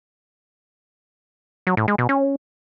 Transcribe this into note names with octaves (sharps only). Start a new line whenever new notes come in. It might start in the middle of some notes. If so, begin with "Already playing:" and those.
F#3
A2
G#3
B2
C#4